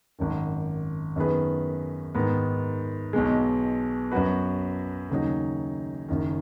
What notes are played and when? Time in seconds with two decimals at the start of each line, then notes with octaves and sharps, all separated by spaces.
0.19 G#1 F#2 D#3
1.16 F#2 D#3 B3 G#4 B4
2.15 G#2 D#3 B3
3.13 B1 B2 G#3
4.11 F#2 F#3 B3 F#4 B4
5.10 D#2 C#3 F#3 D#4
6.08 F#1 F#2 D#3